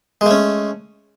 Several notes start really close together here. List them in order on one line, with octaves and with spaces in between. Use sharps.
G#3 A3 C#4